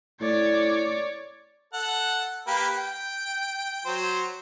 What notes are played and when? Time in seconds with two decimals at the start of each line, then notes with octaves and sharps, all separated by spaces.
0.21 A2 C#5 D5
1.74 A4 F#5
2.47 A#3 G4 B4
2.77 G5
3.86 F#3 C5